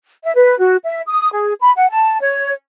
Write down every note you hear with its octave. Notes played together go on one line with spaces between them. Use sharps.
E5
B4
F#4
E5
D#6
G#4
B5
F#5
A5
C#5